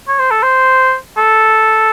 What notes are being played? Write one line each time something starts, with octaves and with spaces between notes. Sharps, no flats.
C#5
C5
A4
C5
A4